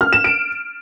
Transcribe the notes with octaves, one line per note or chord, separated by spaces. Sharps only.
F6
E7
D7